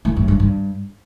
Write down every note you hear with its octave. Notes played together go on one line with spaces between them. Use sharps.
A2
F#2
G2
G2